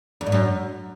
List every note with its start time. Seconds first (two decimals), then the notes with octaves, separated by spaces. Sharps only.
0.21 E2
0.26 G#2
0.32 F#2